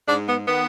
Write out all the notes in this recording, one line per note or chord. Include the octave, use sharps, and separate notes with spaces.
G#2 D4
B3
D#3 B3